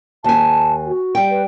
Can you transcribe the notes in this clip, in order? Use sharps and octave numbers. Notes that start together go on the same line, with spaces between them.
D#2 G#5 A5
F#4
G3 G5
B4